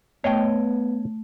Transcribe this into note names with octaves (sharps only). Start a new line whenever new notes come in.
A3 B3 C#5 D#5 G5